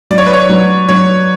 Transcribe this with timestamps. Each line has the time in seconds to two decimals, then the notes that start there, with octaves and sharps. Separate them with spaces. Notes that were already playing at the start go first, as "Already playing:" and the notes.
0.10 F#3 D5
0.18 C#5
0.26 B4
0.33 C#5
0.49 F#3
0.89 F#3 C#5